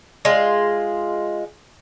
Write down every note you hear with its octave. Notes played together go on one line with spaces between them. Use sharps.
G#3 F4